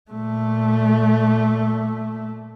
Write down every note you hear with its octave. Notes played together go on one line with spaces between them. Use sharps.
A#2 A3